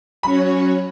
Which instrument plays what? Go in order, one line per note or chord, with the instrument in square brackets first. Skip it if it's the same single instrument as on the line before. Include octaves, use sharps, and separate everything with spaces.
[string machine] F#3 C#4 F#4 C#5 [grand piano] B5